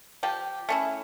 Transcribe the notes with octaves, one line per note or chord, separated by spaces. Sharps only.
F3 G4
A3 C#4 E4